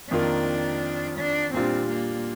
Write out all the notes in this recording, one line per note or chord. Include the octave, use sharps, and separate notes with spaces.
F2 D#3 A#3 D4 F4
D4
A#2 G3 C4 D4 F4
A#3